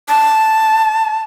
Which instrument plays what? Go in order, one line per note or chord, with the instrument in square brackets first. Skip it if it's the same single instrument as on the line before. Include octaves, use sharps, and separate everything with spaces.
[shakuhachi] A5